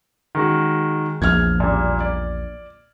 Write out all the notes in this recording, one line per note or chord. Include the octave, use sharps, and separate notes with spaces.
D#3 G#3 F#4
A#1 E2 F6 G#6
A#2 G3
D5